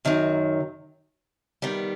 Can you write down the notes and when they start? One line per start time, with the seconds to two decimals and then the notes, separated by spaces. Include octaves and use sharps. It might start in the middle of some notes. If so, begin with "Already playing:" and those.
0.05 F#2 D#3 F#3
1.62 D#3 G3 B3